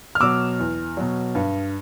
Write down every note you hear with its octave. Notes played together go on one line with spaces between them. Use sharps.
F6
B2 F#3 D6 E6
E2
B2 F#3
G2